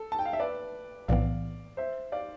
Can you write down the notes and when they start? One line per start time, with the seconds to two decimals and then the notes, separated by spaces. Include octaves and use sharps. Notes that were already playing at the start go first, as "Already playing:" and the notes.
Already playing: A4
0.12 A5
0.19 G5
0.26 F5
0.33 E5
0.40 B4 D5
1.08 B1 A2 E3 B3 D5 F5
1.77 C5 E5
2.12 D5 F5